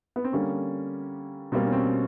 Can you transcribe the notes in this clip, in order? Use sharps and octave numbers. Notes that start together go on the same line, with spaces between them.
B3
C4
D3 G3 A#3 C#4
B2 G3 A#3 C4
C#4
C4